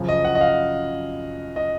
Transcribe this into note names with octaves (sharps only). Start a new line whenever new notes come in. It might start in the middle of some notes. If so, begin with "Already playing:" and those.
Already playing: F#2 C#3 F3
D#5
F#5
D#5
F5
D#5